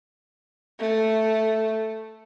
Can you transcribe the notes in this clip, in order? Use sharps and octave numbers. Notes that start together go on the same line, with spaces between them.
A3